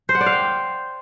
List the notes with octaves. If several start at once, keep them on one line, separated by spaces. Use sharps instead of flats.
C5
F#5
D5
F5
G5